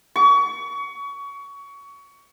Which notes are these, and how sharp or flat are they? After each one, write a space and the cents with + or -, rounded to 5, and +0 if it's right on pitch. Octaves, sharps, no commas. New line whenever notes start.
C#6 +25